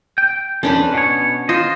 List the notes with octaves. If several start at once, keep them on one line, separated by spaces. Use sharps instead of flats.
G5
F2 C#4 D4 B4
B2 C#5
F4 C5 D#5